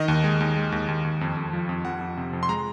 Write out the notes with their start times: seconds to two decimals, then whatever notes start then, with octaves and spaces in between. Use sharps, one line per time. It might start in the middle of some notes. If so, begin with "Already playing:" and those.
Already playing: D#3 D#5
0.08 D#2
0.24 G#3
0.40 D#2
0.56 G#3
0.72 D#2
0.88 D#2
1.05 D#2
1.21 F2
1.37 F2
1.53 F3
1.69 F2
1.85 F2 F#5
2.01 F2
2.17 C3
2.33 F2
2.43 C6
2.49 G#3 A#5